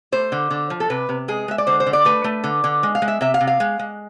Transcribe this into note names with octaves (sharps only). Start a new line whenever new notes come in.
A3 C5
D3
D3
F3
A4
C3 B4
C3
G#3 G#4
G#3 E5
D5
D3 C5
C5
D3
D5
A3 B4
A3
D3
D3
G#3
F5
G#3
E5
C3 E5
F5
C3
F5
G#3
G#3